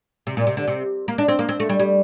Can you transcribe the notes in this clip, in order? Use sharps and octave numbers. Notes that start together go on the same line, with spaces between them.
C3
A#2
C3
D3
C3
A#3
D4
C4
A#3
C4
A3
G3
G3